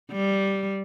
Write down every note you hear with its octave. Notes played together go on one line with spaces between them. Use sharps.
G3